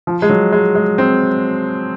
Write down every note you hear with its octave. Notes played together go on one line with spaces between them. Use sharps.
F3
G#3
F#3
G#3
G#3
C4